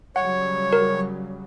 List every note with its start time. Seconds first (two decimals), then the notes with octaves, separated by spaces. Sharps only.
0.16 C#3 F#3 G3 C#5 F#5
0.73 A#4